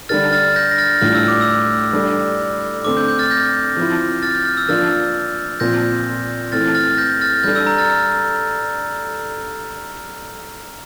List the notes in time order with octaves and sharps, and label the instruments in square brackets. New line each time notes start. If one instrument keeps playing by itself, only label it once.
[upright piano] D3 G3 D4 G4 A#4 [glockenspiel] F6 A6
[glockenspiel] F6 A6
G6 A#6
A#6
F6 A6
[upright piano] A2 G3 D4 F4 [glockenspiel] F6
[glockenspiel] E6
D6
E6
[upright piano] G3 D4 A4
[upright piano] D3 A3 C4 [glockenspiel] D6
[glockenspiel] G6
G6
F6 A6
G6 A#6
[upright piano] F3 C4 E4
[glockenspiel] F6 A6
G6
F6
E6
[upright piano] F3 A#3 D4 F4 [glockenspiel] F6 A6
[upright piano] A#2 F3 C4 [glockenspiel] G6 A#6
[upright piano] E3 A3 C4 [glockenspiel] F6 A6
[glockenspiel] F6 A6
G6 A#6
F6 A6
[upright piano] G3 D4 A4 [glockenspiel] G6
[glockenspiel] E6
A#5
F6 A6